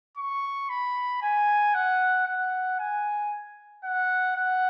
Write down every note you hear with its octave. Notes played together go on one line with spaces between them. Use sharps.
C#6
B5
G#5
F#5
F#5
G#5
F#5
F#5